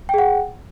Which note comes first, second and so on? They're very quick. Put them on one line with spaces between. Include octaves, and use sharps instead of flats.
G5 G#4 F#5